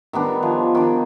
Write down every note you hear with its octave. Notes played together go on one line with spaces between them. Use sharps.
D#3 G3 B3 D4
F3 G#5
D#3 D4